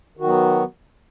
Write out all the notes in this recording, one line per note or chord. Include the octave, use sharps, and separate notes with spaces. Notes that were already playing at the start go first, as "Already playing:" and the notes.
D#3 F#3 B3 F#4